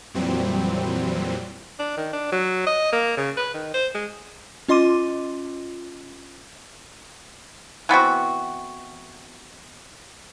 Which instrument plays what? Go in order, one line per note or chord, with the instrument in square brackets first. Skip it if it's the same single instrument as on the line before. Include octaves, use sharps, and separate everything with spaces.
[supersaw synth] F2 A#2 E3 F#3 G3 C4
[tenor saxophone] D4
D#3
D4
F#3
D#5
A#3
C#3
B4
D#3
C5
G#3
[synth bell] C#4 F4 D#5 C6 D6 D#7
[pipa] E3 B3 C4 F#4